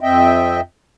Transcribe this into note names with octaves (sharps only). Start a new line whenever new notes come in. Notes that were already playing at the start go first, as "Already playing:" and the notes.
F2 C4 D#5 E5 G5